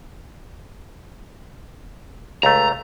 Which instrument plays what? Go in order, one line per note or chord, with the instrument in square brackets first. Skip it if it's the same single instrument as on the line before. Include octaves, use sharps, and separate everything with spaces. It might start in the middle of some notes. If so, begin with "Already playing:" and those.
[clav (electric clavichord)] C#2 A3 [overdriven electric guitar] A#5